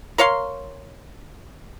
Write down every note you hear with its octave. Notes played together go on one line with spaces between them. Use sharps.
A#4 C#5 F5 C6